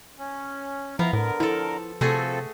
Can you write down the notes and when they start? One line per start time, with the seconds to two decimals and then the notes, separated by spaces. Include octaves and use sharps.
0.19 C#4
0.99 F3 B3 E4 F5 A#5
1.13 A2 D3 A#4
1.40 F3 E4 A4
2.01 C3 F3 A3 C4 F#4 G#4 A4